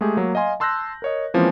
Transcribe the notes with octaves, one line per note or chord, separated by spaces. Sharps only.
G#3 A3 G4 G#4
F#3 A#3
D#5 F5 G#5 C6
A5 C6 E6 F#6 G6 A#6
A#4 C#5 D#5
E3 F3 G#3 A#3 C4 C#4